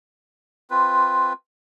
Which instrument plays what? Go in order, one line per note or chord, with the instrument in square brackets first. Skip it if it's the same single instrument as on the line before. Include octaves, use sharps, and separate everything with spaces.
[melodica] C4 F4 B4